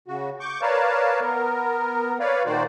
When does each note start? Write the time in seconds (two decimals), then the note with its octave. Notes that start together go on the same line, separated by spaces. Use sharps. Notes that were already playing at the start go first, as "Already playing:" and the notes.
0.08 C#3 F#4
0.40 C#6 D6 G6
0.62 A#4 B4 C#5 D5 F5 A5
1.20 B3 A#4
2.20 B4 C#5 D5 F5
2.46 A#2 D#3 F#4 C5 D5